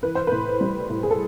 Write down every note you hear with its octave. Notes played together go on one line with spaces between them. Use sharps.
E3 B4
C5
A2 B4
G3
A2
G#4
A4